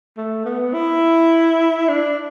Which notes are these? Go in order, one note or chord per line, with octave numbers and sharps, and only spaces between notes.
A3
B3
E4
D4